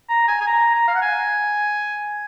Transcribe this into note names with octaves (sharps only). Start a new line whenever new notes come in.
A#5
G#5
G#5
A#5
A#5
F5
F#5
G#5